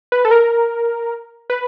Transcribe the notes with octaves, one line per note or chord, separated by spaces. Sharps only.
B4
A4
A#4
B4